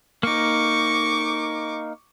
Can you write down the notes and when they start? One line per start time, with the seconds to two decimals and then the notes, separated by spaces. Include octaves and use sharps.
0.23 A#3 D#4 C#6 D6